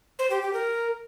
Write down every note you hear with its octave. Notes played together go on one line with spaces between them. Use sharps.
C5
G4
G4
A#4